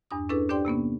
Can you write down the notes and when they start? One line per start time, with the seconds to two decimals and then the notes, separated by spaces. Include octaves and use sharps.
0.11 E2 G2 D4 D#6
0.29 C#4 D4 E4 G#4 A4 B4
0.49 D4 G4 C5 D5 G5 C6
0.65 C3 A#3 B3 C#4